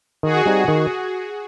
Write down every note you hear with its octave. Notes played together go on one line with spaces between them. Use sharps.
D#3 F#4 G#4
G3 C4 D#4
D#3